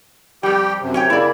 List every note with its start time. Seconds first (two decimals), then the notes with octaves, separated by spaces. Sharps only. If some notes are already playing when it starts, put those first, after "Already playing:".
0.43 F2 G3 G4 G5
0.81 F#2 C3
0.94 C#4 C#5 G5
1.10 C#3 A#3 E4 D5